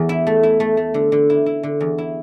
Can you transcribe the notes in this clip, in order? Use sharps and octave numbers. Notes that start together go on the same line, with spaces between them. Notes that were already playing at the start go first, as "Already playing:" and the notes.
Already playing: E2
E4
A3
E4
A3
A3
D3
D3
E4
E4
D3
E2
E4